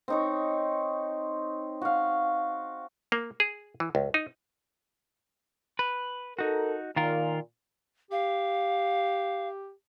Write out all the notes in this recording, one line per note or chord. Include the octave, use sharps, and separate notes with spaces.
C4 D#4 C#5
F#4 F5
A#3
G#4
E3
C#2
D#4
B4
D#4 F#4 A4 A#4
A#2 D#3 F4 A#4
G4 F5